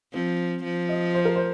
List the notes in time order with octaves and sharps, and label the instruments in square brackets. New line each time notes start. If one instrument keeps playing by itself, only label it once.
[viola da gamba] F3 [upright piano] C4
[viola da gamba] F3
[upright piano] D#5
C5
A#4
C5